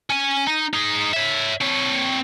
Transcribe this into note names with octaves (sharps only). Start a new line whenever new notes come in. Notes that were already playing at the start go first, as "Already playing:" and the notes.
C#4 G#5
D#4
D#4 G#4
C#5 E5
C4 C#5